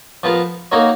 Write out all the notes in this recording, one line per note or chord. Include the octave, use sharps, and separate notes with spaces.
F3 B3 F4 A#4
A#3 D#4 F#4 A#4 C#5